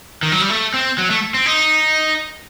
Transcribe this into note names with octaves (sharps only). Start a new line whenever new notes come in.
D#3
F#3
G3
A3
C4
F#3
A3
C4
D#4